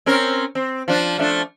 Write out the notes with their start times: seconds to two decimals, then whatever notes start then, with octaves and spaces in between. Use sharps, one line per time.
0.06 C4 C#4 A#4
0.55 C4
0.88 F3 D4
1.18 F3 A3 D4